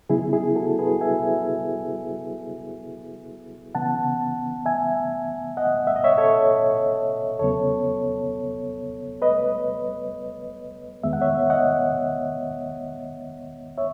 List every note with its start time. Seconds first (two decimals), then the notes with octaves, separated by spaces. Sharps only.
0.10 C#3 F#3 B3 E4 G#4
0.33 E4 G#4
0.55 F#4 A4
0.79 G#4 B4
1.01 E5 G#5
3.75 C#3 E3 B3 F#5 A5
4.66 E5 G#5
5.57 D#5 F#5
5.87 E5
5.96 D#5
6.04 C#5 E5
6.18 A4 C#5
7.39 E2 C#3 F#3 B3 A4 C#5
9.22 B4 D#5
11.04 E2 D#3 G#3 B3 E5
11.13 F#5
11.21 C#5 E5
11.50 D#5 F#5
13.78 C#5 E5